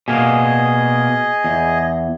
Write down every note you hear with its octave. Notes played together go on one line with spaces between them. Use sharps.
B2 A#3 G#4 D#5
E2